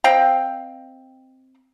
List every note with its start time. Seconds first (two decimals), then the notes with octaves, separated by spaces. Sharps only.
0.04 C4 D#5 F5 G5